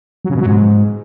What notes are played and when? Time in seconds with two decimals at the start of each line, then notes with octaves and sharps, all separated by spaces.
0.25 F#3
0.30 C#3
0.35 B2
0.41 F#3
0.46 G#2